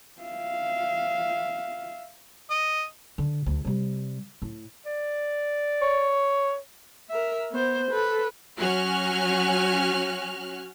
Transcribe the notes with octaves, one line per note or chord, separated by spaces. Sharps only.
E5 F5
D#5
D3
D2
C3 G3
A2
D5
C#5
A#4 E5
B3 C5
A4 B4
F#3 C#4 F#4 G#5 F6 F#6